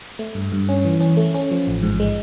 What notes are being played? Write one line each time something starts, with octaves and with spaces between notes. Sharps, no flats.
A3
G2
G2
C#4
E3
C#4
A3
C#4
F3
A1
G#2
G#3